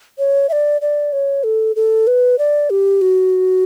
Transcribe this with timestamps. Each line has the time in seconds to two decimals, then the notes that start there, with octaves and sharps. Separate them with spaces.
0.19 C#5
0.49 E5
0.52 D5
0.81 D5
1.13 C#5
1.44 A4
1.76 A4
2.07 B4
2.39 D5
2.70 G4
3.01 F#4